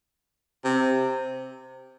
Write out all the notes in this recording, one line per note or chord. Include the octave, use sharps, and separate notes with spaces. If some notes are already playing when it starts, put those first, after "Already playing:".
C3